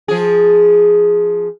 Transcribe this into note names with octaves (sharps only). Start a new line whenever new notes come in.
F3 G#4